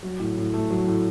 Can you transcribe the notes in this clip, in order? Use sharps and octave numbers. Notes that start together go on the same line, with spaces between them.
F#3
A2
A2
A3
F#3
A2